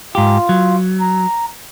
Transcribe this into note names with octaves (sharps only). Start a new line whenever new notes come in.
G#2 F4 G4
F#3
A#5